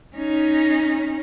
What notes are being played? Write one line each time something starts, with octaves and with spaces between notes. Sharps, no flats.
C#4 D#4